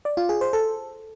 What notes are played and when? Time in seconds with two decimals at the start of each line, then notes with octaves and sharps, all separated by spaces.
0.05 D5
0.17 F4
0.29 G#4
0.41 C5
0.53 A4